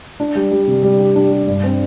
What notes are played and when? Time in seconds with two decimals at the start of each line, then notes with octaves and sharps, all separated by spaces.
0.20 D4
0.35 G3
0.51 G3
0.67 C3
0.83 G3
1.00 G4
1.15 D4
1.32 G4
1.47 G2
1.64 C4